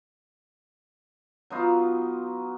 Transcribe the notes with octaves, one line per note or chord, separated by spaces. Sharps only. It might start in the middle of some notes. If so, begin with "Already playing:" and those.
F#3 B3 D#4 F4